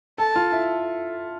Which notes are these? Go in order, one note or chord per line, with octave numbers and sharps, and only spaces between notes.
A4 A5
F4
E4